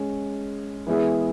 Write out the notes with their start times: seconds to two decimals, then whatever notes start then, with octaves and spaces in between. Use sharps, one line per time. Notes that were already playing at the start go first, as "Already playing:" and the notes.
Already playing: G#3 C#4
0.87 E3 G#3 B3 E4 G#4